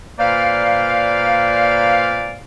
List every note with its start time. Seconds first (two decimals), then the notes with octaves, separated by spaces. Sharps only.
0.19 A#2 A#3 B4 C5 D5 F5